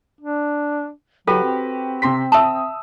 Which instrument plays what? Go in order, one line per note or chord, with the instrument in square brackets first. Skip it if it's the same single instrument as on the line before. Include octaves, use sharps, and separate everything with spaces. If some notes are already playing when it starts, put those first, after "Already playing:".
[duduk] D4
[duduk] F#3 [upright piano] F#4 G4 B4 [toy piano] A4
[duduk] C4
[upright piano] C3 C6 B6
[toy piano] E5 A5 [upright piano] D#6 E6